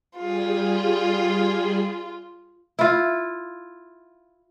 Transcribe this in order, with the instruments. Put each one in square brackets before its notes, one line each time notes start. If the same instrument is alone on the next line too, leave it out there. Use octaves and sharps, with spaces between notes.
[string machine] G3 G#4 [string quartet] F4
[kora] E4 F4